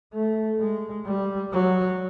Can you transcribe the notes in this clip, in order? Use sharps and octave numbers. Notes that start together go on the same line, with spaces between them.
A3
G#3
G3
F#3